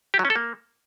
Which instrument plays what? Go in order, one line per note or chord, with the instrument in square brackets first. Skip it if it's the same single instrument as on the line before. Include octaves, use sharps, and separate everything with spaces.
[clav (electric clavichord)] G4
F#3
C#4
A4
A#3